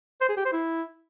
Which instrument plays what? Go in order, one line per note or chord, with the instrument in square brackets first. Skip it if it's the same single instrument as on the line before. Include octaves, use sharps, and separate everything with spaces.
[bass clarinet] C5
G#4
G4
C5
E4